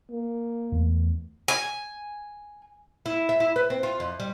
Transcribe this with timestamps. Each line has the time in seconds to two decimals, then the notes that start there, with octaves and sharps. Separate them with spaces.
0.11 A#3
0.72 E2 E3 A3
1.48 G#5
3.06 E4
3.29 E5
3.40 E4
3.56 B4
3.70 C4
3.83 F4
4.00 F2
4.20 G3